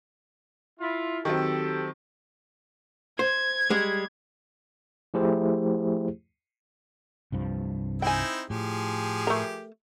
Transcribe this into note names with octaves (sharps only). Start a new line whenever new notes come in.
E4 F4
D#3 F#3 C4 G4 A4
C5 G#6
G3 G#3
F3 A3 E4 G4 G#4 C5
C2 G2 F3
C4 D#4 E4 G5 G#5
A2 F3 G4 G#4
A3 A#4